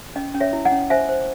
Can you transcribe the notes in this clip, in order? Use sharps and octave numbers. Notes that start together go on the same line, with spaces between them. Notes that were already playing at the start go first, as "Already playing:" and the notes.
C#4 D#5
C#4
C#5 E5
E4
D#5 F#5
C#4
C5 E5 G#5
C5